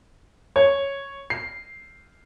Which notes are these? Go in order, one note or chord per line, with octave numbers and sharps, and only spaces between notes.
C#5
C7